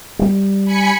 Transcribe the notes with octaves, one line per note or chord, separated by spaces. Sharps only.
G3
G#5 B5 C#7